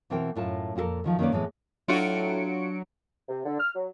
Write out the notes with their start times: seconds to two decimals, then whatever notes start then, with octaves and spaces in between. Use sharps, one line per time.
0.10 B2 E3 C4 A#4 G5
0.35 F#2 A2 F4 A5
0.75 F2 A#2 F#4 A4 A#4
1.04 D2 D#3 F3
1.19 D#3 A#3 C#4 B4 D5
1.32 A2 E3 G#3 B3
1.88 A2 F#3 D4 F4 F#4 C#7 D7
3.28 C3
3.46 D3
3.60 F6
3.75 F#3